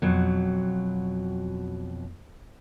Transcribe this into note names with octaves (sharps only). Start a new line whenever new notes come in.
F2 B2 F#3